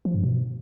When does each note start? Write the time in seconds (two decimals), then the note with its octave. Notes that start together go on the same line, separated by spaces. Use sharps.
0.05 F3
0.14 G2
0.23 B2